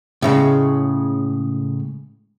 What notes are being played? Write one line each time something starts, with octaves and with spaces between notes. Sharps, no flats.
A2 C#3 G#3